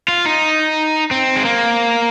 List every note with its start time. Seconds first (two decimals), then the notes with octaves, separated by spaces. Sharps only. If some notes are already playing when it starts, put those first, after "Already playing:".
0.08 F4
0.26 D#4
1.11 C4
1.36 G#3
1.45 A#3